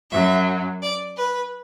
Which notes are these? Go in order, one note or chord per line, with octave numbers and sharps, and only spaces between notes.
F#2 F#3 E5
D5
B4